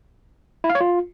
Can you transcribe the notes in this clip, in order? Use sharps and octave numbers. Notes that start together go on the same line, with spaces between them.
E4
F5
C#5
F4